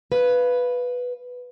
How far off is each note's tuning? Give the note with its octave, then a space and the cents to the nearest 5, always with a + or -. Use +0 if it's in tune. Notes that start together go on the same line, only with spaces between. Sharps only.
B4 +0 F5 +0